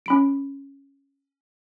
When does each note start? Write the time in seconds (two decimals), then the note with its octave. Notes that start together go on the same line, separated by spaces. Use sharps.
0.06 C#4 B5 D7